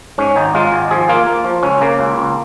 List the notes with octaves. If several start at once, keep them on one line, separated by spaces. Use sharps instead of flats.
G#2 C#4
G#1 D#4
G#3 F4
G#1
F3 G#4
A#3 F4
A#3
F3
C#2 C#4
C#3 A#3
C#2
C#2